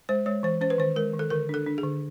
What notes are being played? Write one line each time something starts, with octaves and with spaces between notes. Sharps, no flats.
G#3 C5
G#3 C#5
E3 C5
C#4 C5
B4
D#3 C5
G#3 A#4
D#3
A4
D3 A#4
D4 A4
D4
G#4
D3